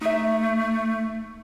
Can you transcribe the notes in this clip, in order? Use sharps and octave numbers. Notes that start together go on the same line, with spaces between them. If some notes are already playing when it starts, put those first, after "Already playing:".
A3 D#4 E5